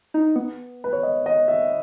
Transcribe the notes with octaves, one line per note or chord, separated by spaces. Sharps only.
D#4
B3
B4
C#5
D#5
D#5
E5